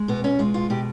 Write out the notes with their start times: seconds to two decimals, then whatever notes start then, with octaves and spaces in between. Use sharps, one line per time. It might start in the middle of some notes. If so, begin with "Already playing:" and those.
Already playing: G#3
0.08 B2 B3
0.24 C#4
0.39 G#3 F4
0.54 F4
0.70 B2 G4